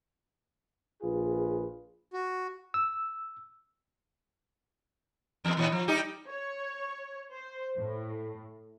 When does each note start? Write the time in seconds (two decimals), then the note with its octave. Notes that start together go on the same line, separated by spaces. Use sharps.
1.02 A#1 F4 G#4 B4
2.13 F#4
2.74 E6
5.45 E2 B3
5.57 A#2 E3
5.72 F3
5.88 G3 D#4 G4
6.27 C#5
7.31 C5
7.78 A2